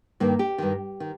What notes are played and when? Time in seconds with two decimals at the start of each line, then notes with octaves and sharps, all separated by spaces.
0.20 G2 D#3 A#3
0.39 G4
0.58 G2 D#3
1.00 D#3